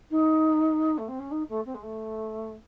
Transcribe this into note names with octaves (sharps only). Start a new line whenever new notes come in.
D#4
A3
C4
C#4
D#4
A3
C4
G#3
A3